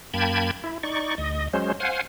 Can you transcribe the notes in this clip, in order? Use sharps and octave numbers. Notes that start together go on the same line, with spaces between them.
F#2 A#3 G5 A5 B5 G#6
E4
D#4 D5 C#6
D2 D#5
F#3 G#3 C#4 C5
C5 F5 F#5 G#5